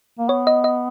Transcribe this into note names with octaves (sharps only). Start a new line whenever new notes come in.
A#3
B3 C#5
D#5
D#5